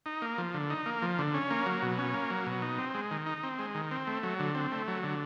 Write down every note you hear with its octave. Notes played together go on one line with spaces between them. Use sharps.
D#4
A#3
F3
D3
D#4
A#3
F3
D3
C#4
A#3
F#3
B2
C#4
A#3
F#3
B2
D#4
C4
G#3
D#3
D#4
C4
G#3
D#3
C4
A3
F#3
D3
C4
A3
F#3
D3